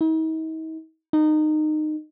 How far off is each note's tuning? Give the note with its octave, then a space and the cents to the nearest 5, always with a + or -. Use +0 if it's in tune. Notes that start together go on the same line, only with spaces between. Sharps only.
D#4 +45
D#4 -20